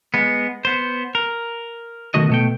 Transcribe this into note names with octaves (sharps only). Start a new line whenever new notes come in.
G#3 B3
B3 C5
A#4
B1 F2 D#3 A3 F#4 D#5
B2 A3 G5